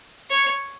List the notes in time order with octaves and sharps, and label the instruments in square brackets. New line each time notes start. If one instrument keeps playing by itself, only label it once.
[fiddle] C#5